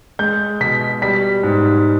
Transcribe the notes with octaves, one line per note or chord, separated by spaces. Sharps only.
G#3 G6
B2 B6
G3 B6
G#2